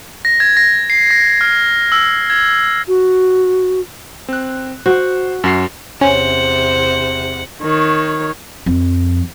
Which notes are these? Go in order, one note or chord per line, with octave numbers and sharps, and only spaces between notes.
A#6
G#6
A#6
C7
A#6
F6
E6
G#6
F#4
C4 F#6
F#4 C5
F#2 F#4 C7
E2 C3 C#4 C5 F#5
D#3 C#5
F2